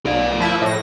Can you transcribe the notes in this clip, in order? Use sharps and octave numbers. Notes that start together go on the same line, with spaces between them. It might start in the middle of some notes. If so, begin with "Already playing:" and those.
B1 A#4 D5
F3 E4
A2 A#6